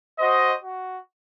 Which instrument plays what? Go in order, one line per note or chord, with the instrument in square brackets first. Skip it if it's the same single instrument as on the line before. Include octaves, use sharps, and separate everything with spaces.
[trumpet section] F#4 C5 D#5
F#4